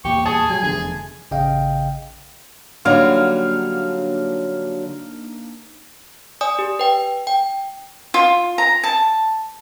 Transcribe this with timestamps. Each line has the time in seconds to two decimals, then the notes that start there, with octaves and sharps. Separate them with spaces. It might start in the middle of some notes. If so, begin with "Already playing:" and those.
0.05 E2 A#2 G4 C#6
0.26 G#4 A5 D#6
0.50 F#3 G3 G#5
0.63 F1 E2 D3 G#4
1.31 A1 C#3 D#5 F5 G5
2.85 D3 F#3 G3 A#3 D4 D#4 F5
6.41 D5 G#5 D#6
6.59 G4
6.79 B4 G5
7.27 G5
8.14 F4
8.58 A#5
8.84 A5